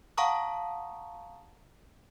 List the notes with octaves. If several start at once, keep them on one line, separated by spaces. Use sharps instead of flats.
F5 F#5 A5 A#5 C#6 D#6